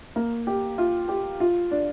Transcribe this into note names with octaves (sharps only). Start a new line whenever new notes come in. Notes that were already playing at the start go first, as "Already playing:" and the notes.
A#3
G4
F4
G4
F4
D4